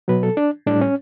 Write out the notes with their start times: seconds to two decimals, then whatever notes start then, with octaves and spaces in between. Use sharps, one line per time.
0.08 B2 F#3 B4
0.23 A4
0.37 D4
0.66 A2 G3 D4
0.81 C#4